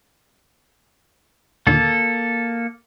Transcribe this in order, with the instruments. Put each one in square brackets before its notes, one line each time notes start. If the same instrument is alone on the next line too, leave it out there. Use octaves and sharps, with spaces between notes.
[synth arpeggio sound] D#2 A#2 D3 [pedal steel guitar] A#3 A4